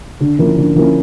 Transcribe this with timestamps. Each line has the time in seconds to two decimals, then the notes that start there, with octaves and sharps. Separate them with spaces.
0.20 D3
0.39 F3 A#3 C#4 E4
0.58 D3
0.76 F3 A#3 C#4 E4